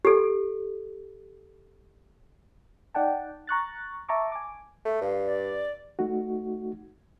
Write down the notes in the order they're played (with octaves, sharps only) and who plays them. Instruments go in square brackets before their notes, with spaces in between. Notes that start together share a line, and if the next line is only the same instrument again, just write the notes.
[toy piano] G4 A4
[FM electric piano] D#4 D5 F#5 G5 A5
A#5 C#6 F#6 A6
E5 A5 A#5 C#6 D6
G#5 D6
[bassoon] A3
[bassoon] G2 [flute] F5
[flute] D5
[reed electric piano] A3 D#4 F#4